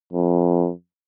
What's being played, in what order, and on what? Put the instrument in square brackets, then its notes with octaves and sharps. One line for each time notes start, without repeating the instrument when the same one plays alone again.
[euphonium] F2